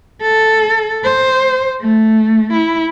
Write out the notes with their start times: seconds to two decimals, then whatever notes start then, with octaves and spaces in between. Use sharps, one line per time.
0.21 A4
1.04 C5
1.81 A3
2.53 E4